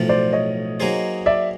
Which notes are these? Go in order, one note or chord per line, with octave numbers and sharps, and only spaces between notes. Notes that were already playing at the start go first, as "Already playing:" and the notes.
Already playing: B1 A2 F3
C5 D5
C#5 D#5
F#3 A#3 D#4 G#4 C5
D5 E5